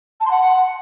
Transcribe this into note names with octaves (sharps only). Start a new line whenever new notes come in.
A5
C6
F#5